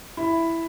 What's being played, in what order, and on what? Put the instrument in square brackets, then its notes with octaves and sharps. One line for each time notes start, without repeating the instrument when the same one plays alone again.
[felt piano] E4